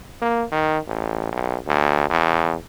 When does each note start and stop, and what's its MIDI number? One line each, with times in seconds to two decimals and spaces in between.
0.22 0.44 58
0.52 0.78 51
0.87 1.27 33
1.32 1.57 35
1.67 2.10 38
2.10 2.55 40